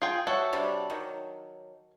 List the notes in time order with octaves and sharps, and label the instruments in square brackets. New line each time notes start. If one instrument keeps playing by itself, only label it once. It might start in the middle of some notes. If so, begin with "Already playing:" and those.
[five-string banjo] F4 G#4 G5
[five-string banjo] F#4 A4 C#5 [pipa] E5
[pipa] C3 G3 D4
D#3 F#3